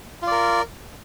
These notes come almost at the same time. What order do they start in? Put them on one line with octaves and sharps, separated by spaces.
F4 D5 A#4